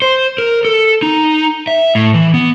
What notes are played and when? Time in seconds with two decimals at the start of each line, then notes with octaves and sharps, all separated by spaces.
0.02 C5
0.38 A#4
0.65 A4
1.02 D#4
1.67 E5
1.95 A2
2.14 E3
2.34 B3